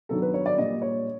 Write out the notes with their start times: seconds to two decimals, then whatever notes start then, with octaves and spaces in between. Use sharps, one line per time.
0.09 G2 D#3 F#3 B3 A4
0.22 B4
0.34 C#5
0.46 D5
0.58 A#1 A#2 G3 D#5
0.82 C#5